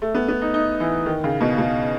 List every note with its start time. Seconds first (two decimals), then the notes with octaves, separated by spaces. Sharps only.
0.02 A3
0.15 B3
0.28 B3
0.42 D#4
0.54 D#4
0.80 E3
1.06 D#3
1.24 C#3
1.40 B2
1.58 B2